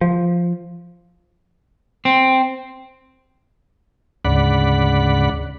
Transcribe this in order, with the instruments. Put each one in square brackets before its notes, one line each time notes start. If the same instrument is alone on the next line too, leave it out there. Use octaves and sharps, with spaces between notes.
[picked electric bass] F3
[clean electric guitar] C4
[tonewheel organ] D2 G#2 C#3 D5 F#5 B5